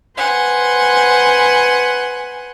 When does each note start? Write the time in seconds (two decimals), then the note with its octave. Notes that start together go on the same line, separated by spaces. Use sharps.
0.17 B4 C5 F#5 G#5